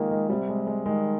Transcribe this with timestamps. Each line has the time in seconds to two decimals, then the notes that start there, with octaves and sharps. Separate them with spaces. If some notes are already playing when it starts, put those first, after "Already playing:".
Already playing: D#3 F3 G#3 A#3
0.11 G#3
0.29 C3 G3
0.49 G#3
0.67 G#3
0.86 D#3 G#3